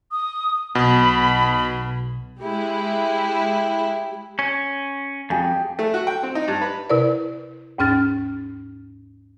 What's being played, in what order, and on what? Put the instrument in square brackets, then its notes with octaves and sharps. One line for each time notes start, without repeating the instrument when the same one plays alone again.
[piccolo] D#6
[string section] B1 [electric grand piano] B2 [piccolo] B5
[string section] G#3 E4 [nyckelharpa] G4
[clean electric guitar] C#4
[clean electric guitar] F2 [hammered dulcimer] G4 G#4
[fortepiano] A3
F#4
G5
C4
D#4
G2
B4
[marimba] C3 E4 A#4 B4 D5
D#2 G#2 C#4 F6 A6